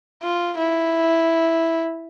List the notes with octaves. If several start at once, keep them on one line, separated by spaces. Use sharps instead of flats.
F4
E4